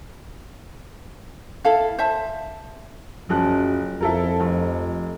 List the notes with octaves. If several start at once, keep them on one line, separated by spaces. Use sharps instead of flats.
E4 A4 F5
C5 E5 A5
F#1 F#2 F3 F#6
F2 E4 A4 A#4
F1